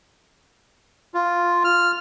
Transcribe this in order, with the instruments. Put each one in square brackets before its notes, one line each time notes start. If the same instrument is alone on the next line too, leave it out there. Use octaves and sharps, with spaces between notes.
[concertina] F4
F6